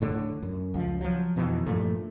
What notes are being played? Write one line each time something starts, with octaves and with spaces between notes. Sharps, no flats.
D1 A2 D3
F#2
C#2 F3
F3 F#3
F2 B2 D#3 E3
G2 A#2 F3 A3